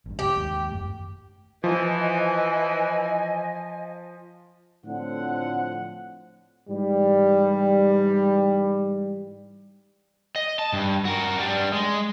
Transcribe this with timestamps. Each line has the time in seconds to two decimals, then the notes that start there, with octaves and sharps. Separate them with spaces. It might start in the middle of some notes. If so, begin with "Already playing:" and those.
0.06 A1 G2
0.19 C#2 G4
0.33 D#2 G#2
0.72 G1 F#2 A3
1.64 E3 F3 D#5 G#5
4.85 A2 D3 F3 C4 F#5
6.69 G#2 E3 G3
10.36 D#5
10.59 A5
10.73 G2
11.05 F#4 A#4
11.38 G3 D4
11.73 G#3